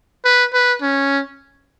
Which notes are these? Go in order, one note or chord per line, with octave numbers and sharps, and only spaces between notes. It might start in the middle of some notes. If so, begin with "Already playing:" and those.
B4
B4
C#4